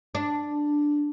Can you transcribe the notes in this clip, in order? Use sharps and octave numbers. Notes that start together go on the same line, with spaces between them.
D4